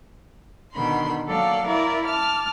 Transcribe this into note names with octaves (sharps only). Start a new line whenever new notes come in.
B2 D3 D#3 B5 C6
F#3 A#3 A4 D5 F5
E4 A#4 D5
A5 D6 F6